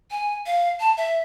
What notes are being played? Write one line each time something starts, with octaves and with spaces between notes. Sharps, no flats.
G#5
F5
A5
E5